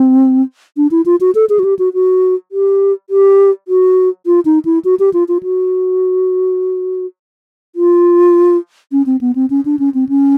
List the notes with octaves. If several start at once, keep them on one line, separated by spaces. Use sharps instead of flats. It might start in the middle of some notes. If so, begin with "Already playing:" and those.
Already playing: C4
D4
E4
F4
F#4
A4
G#4
F#4
G4
F#4
F#4
G4
G4
F#4
F4
D#4
E4
F#4
G4
F4
F4
F#4
F4
C#4
C4
B3
C4
C#4
D4
C#4
C4
C#4